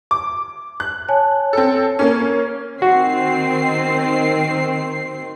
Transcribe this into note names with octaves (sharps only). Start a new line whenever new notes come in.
D6
F#6
C#5 G#5 A5
C4 A4
A#3 C#4
D#3 C4 F#4 C7